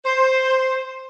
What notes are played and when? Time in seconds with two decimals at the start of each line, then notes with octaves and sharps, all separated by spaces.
0.05 C5